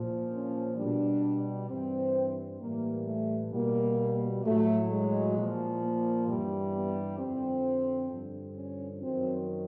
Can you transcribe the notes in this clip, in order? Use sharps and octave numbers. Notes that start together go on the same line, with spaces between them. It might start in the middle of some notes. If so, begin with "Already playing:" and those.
Already playing: A#2 F3
C#4
B2 G3 D4
G2 E3 G3 C4
A2 E3 G3 A#3
A3
B2 G3 A#3
A2 F#3 A3
G#3
A#2 F3
A#3
G2 E3 G3
B3
F2 D3 F3 C4
G2 D3 F3
C#4
F#2 D#3 F#3 C4